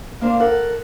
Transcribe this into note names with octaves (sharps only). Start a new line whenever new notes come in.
A#3 D4 C5 F5
A4 A#4 F#5